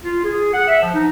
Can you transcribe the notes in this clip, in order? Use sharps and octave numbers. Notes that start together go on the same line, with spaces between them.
F4
G#4
F#5
E5
F3
D#4